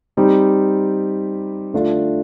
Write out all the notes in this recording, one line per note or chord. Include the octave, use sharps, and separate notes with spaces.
G3 C4 D#4 G4
D3 A3 D4 F4